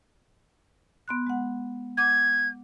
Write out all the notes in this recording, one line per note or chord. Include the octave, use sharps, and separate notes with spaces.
B3 C6 F#6
G#3 F#5
F#5 D6 G6 G#6